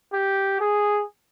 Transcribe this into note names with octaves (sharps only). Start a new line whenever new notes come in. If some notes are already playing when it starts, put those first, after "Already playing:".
G4
G#4